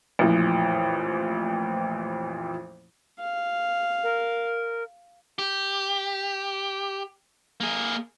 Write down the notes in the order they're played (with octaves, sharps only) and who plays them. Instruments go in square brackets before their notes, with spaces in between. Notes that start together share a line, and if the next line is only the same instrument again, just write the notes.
[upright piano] A1 F2 A#2 E3 F3
[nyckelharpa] F5
[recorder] A#4
[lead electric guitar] G4
A#3 G#4